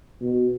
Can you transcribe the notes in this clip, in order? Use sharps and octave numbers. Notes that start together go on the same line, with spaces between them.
B2